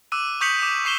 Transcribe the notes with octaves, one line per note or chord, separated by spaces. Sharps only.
D6 E6 F#6 D#7
C#6 D#6 G6 B6 C#7 F#7
D6
C#6 C7 E7 G7